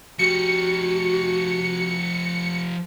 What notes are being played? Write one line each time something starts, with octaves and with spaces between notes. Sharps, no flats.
F3 F#4 G4 C#7